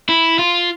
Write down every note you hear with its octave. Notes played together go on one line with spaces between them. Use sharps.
E4
F4